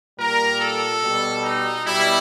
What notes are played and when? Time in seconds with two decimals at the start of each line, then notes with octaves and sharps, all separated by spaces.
0.18 A#2 G3 A#4
0.60 A4
1.02 B2 G3
1.44 D#4
1.86 B2 G3 E4